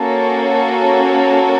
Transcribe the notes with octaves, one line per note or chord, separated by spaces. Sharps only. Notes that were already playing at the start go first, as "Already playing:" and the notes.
Already playing: A#3 C#4 F#4 A4